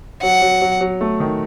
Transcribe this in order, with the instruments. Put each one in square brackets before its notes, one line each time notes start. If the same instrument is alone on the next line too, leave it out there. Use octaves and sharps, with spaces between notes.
[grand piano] F#3 [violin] F#5
[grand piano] F#3
F#3
F#3
A3
D#3